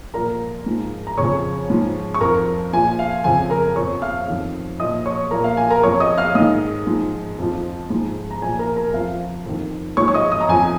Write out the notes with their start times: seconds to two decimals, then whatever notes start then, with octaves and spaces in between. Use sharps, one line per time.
0.14 A#2 F3 A#4 A#5
0.66 G#2 F3
1.07 A#5
1.17 F2 C#3 F3 C#5 C#6
1.70 G#2 F3
2.14 C#6
2.21 F2 F3 A#4 A#5
2.73 A#2 F3 G#5
2.99 F5
3.24 F2 C#3 F3 G#5
3.50 A#4 A#5
3.76 F2 F3 C#5 C#6
4.02 F5 F6
4.28 F2 D#3
4.80 A#2 F3 D#5 D#6
5.06 C#5 C#6
5.31 A#2 F3 A#4 A#5
5.44 F5
5.57 G#5
5.70 A#4 A#5
5.83 F2 F3 C#5 C#6
6.00 D#5 D#6
6.18 F5 F6
6.35 G#2 D#3 D#5 D#6
6.87 G#2 F3
7.38 F2 F3
7.90 G#2 F3
8.31 A#5
8.41 A#2 F3 G#5
8.59 A#4 A#5
8.76 A#4 A#5
8.94 F2 F3 F5
9.46 F2 D#3
9.97 G#2 F3 C#5 C#6
10.08 C#6
10.14 D#5 D#6
10.32 D#5 D#6
10.41 A#5
10.48 F2 F3 G#5